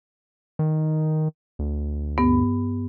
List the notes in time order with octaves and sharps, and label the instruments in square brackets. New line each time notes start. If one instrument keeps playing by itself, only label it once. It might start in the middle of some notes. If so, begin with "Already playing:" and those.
[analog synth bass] D#3
D2
[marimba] G2 B3